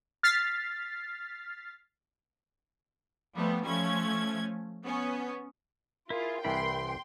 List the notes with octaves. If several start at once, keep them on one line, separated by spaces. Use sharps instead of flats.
F6 A6 B6 C7
F3 G3 A3 B3
F3 A3 C#4 G#6
B3 C#4
E4 F4 G#4 A#4
C2 E3 D5 G5 B5 C6